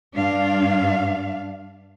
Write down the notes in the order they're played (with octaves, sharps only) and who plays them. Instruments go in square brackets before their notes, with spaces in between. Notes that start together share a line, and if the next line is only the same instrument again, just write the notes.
[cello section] G2 D4 F5